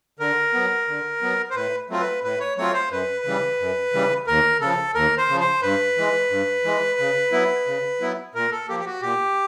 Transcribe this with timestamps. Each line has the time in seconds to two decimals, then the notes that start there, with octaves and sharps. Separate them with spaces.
0.19 D3 A#4
0.54 F#3 B3
0.88 D3
1.22 F#3 B3
1.50 C5
1.55 A2 B4
1.90 F#3 A3 C4 F4
2.00 B4
2.23 A2 B4
2.40 C#5
2.57 F#3 A3 C4 F4 C#5
2.74 C5
2.91 F#2 B4
3.25 C#3 E3 G3
3.60 F#2
3.93 C#3 E3 G3
4.27 D#2 A#4
4.60 C#3 F3 A4
4.95 D#2 A#4
5.18 C5
5.29 C#3 F3
5.40 C5
5.62 G2 B4
5.97 E3 G#3
6.30 G2
6.64 E3 G#3
6.99 C#3
7.32 F#3 B3 E4
7.67 C#3
8.00 F#3 B3 E4
8.35 A#2 A#4
8.52 A4
8.69 F3 A#3 G4
8.80 G4
8.86 F#4
9.02 A#2 G4